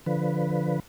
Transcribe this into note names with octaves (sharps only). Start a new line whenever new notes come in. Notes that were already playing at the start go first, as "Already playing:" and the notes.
D3 F3 B4